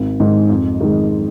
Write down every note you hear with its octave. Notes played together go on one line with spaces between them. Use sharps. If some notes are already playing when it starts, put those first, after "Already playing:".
Already playing: G#1
G#2 D#3
F2
D#3 G#3